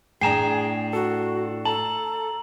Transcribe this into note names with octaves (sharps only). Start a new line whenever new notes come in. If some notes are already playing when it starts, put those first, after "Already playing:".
A2 D4 G#4 G5 G#5 A#5 C7 E7
F#4 A4
A4 A5 A#5 F#7